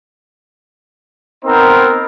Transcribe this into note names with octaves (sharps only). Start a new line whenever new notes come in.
B3 C4 D#4 A#4 C5